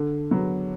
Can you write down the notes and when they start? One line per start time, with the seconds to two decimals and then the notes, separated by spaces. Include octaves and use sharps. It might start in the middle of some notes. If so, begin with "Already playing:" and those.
Already playing: D3
0.31 F#3 B3